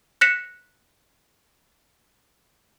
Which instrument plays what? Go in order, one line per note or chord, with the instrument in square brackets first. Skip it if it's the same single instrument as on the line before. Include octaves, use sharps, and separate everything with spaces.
[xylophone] F#6 A#6 B6 C#7 E7